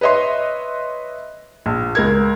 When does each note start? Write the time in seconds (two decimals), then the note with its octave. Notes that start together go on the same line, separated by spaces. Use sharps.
0.01 B4 C#5 D#5 E5 C6
1.66 A#1
1.95 C#2 A#4 G#6